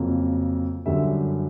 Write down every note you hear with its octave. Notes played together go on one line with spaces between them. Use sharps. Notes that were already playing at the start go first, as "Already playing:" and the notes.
Already playing: F2 C#3 F#3 A#3
F#2 D3 G3 E5